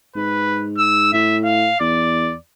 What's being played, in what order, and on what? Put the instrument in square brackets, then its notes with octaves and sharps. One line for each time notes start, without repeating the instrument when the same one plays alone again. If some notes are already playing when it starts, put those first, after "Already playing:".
[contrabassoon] G#2 [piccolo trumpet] B4
[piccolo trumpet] E6
[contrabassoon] A2 [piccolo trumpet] E5
[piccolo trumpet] F5
[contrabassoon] E2 [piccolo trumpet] D5